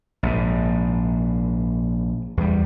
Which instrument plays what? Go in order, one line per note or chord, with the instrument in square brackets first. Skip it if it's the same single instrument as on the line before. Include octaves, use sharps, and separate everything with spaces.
[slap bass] A#1 G#2
E2 G3